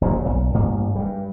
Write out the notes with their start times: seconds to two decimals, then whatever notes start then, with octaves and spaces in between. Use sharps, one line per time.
0.01 F#1 A#2 F3 F#3
0.24 E1 B1
0.54 A1 G2 A#3
0.95 G2 G3